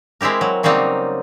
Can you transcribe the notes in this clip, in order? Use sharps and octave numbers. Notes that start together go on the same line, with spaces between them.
G#3 C4 E4 G4 A#4
F#3
C#3 F#3 G3 A#3 C4 D#4